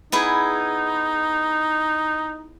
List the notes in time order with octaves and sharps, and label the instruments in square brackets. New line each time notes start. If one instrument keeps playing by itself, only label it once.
[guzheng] B3 E4 G#4 [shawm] D#4